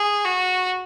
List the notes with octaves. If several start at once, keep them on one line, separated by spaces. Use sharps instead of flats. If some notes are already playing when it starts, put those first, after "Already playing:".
Already playing: G#4
F#4